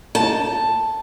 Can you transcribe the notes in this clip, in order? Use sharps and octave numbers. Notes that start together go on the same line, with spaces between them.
A5